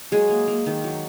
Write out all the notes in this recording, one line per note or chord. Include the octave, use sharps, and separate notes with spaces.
F#3 G#3 G#4
A#3
A#3
D#3
F#3